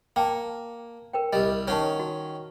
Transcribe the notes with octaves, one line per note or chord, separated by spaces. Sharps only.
A#3 G5 A5
A#4 B4 G5
C2 G3 D#5
D#3 C#4 C#5 F#5 A5
F#4